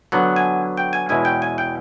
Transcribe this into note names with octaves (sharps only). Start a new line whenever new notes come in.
D3 F#3 B3 F#5
G#5
G5
G#5
E2 B2 G#3 C#4 E4 G#5
G5
G#5
G5